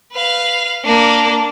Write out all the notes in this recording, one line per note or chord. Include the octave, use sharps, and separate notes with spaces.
B4 F5
A#3 D4